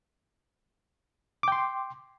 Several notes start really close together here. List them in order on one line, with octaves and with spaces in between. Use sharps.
D6 G5 C6